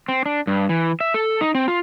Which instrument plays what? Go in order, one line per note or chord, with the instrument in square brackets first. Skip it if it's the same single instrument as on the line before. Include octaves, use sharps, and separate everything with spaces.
[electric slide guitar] C4
D4
G2
E3
E5
A4
D#4
C4
F4